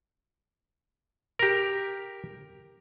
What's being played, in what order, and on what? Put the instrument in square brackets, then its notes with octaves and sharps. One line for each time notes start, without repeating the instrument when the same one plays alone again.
[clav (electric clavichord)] G4 A#4